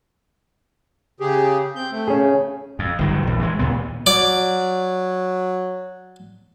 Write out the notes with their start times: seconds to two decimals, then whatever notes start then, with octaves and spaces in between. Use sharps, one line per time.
1.20 C#3 G4 G#4
1.76 C4 G6
1.92 A3
2.08 C#4 G#4
2.79 F2
2.99 G1 D#3 F#3
3.23 A#1 E2
3.40 E3 G#3
3.59 D#2 A#2 B3
4.06 F#3 D5